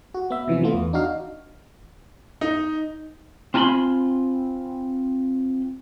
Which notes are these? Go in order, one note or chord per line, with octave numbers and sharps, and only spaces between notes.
F#4
B3 E5
C3 E3 F3 C#4
E3 F3 A3 B3 F4
E2
D4 D#4 F#4 F5
D#4
C4 F4 G#5 A5 B5 C6